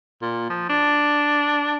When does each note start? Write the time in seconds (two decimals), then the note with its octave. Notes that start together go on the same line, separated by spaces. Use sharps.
0.22 A#2
0.50 F3
0.69 D4